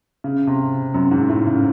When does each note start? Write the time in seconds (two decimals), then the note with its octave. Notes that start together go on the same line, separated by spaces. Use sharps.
0.24 C#3
0.47 C3
0.94 F#2
1.11 G#2
1.29 A2
1.46 C#3